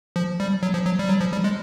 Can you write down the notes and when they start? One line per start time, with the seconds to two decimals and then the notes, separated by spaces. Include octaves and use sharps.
0.16 F3
0.40 G3
0.63 F#3
0.74 F3
0.86 F#3
0.99 G3
1.09 F#3
1.21 F3
1.33 G3
1.44 G#3